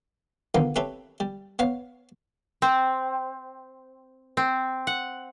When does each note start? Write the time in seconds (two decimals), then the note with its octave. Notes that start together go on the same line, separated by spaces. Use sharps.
0.55 D3 D#3 B3 F4 A#4
0.76 C4 G4 A4 B4 C#5 E5
1.20 G3
1.59 B3 C#5 F5
2.62 C4
4.37 C4
4.87 F#5